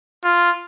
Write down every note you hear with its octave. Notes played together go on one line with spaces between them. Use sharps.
F4